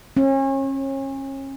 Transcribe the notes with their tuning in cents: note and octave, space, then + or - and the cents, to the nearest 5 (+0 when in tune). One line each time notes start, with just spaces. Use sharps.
C#4 -35